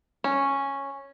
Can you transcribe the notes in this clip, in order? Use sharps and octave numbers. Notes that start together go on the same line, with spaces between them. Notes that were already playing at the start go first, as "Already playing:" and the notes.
C#4